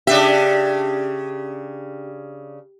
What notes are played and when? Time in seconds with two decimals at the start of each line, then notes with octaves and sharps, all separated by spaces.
0.07 C#3 D4 G4 E5